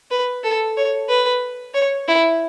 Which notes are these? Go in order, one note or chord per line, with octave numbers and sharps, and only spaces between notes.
B4
A4
C#5
B4
C#5
E4